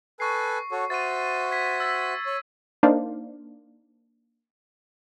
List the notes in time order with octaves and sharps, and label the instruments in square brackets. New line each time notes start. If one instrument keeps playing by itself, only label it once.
[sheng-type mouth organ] A4 B4 G#5 [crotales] C#6 C7
[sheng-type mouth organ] F#4 A4 C#5
[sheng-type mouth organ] F#4 C5 E5 [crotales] A6 D#7
[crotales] G#6 B6
E6 A6 B6
[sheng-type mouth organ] C#5
[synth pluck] A#3 D4 D#4 C5 D5 F5